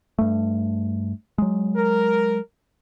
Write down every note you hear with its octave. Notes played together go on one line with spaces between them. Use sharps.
G2 A3
F#3 G#3
A#4